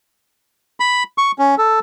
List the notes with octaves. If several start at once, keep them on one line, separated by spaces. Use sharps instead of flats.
B5
C#6
C#4
A4